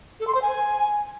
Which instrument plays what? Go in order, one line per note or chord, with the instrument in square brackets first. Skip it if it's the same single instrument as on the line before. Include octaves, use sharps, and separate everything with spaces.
[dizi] A4
C6
C5
G#5